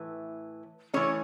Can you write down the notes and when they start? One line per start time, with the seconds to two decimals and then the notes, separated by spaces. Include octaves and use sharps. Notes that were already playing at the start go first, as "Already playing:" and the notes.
Already playing: A2 E3
0.94 E3 A3 C#4 C#5